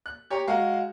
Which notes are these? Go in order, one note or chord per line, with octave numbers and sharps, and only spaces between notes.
F#6
G4 C#5 A#5
G#3 F#4 F5 A#5